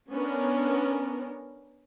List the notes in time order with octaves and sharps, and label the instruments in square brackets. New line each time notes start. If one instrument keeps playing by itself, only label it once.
[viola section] B3 C#4 D4 A#4